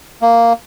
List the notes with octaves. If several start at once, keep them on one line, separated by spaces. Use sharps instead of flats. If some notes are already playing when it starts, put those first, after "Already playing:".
A#3